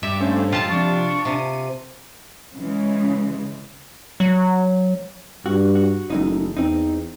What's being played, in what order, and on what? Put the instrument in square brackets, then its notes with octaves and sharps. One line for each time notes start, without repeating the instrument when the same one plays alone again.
[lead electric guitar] G2 [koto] E5 [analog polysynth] D6 B6 E7
[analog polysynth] A3 C#4 C5 [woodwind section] A#3 D4
[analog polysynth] F#2 [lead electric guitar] G#3 G4 [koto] F4 A5
[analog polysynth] C3 F3 [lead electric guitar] D4 [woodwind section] C#6
[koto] C3 [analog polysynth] D#7
[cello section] C#3 E3 G#3
[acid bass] F#3
[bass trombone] G2 [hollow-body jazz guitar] F#4
[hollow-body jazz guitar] F#4
[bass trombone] F#1 [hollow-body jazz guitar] E2 A2 D#4
[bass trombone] E2 [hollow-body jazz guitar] C4 D#4